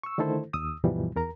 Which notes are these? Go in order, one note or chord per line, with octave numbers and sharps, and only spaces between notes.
C#6 E6
D3 D#3 A3 E4 A4 C5
D#2 D#6 E6
D2 G2 B2 E3 F3 G3
E2 A#4 A#5